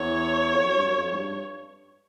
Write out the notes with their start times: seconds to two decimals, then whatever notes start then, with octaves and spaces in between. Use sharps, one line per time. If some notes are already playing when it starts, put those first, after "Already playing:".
Already playing: E2 C#5
0.53 F2
0.64 F#2
0.75 G2
0.85 F#2
0.97 F2
1.12 G#2
1.17 G2